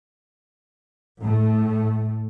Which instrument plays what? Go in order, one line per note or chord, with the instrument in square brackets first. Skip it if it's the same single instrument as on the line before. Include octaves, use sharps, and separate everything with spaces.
[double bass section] A2 A3